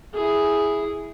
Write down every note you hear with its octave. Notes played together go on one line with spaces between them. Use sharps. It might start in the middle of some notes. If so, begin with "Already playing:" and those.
E4 G#4